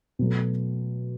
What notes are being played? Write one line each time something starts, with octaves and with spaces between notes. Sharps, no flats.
B2 F#3 A3